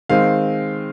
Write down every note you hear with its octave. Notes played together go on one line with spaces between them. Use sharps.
D#3 G#3 C4 F5